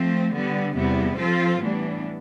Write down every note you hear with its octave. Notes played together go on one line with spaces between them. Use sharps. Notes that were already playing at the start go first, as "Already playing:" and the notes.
Already playing: F3 A3 C4
D3 G3 B3
E2 C3 G3 B3 E4
F3 C4 F4 A4 C5
A2 E3 G3 B3 D4